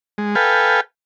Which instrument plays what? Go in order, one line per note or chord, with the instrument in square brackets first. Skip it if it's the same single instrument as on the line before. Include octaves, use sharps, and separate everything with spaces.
[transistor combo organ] G#3
A4 B4 F5 G5 G#5